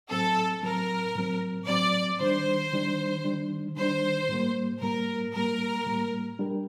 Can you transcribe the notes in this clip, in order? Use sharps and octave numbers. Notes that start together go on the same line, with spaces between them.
A2 F#3 C4 A4
A2 F#3 C4 A#4
A2 F#3 C4
A2 F#3 C4 D5
D#3 G3 D4 C5
D#3 G3 D4
D#3 G3 D4
D#3 G3 D4 C5
A2 G3 A#3
A2 G3 A#3 A#4
A2 G3 A#3 A#4
A2 G3 A#3
G3 D4 G4 A#4